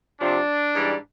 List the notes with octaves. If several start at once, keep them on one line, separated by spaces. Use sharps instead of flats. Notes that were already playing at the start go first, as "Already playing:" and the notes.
C3 F3 D4
G#2 E3 G3